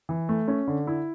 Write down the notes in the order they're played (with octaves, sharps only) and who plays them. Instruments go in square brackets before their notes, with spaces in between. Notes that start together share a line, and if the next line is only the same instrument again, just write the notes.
[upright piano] E3
A3
C#4
D3
E4